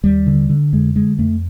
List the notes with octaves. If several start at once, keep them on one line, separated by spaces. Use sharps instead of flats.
D#2 G3
D3
D3
F2 G#3
D3 G#3
F2 A3